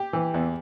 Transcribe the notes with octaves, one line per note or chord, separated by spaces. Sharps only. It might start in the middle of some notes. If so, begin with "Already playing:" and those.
Already playing: G4
E3
E2